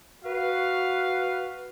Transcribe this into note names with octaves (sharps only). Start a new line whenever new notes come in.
F#4 B4 F5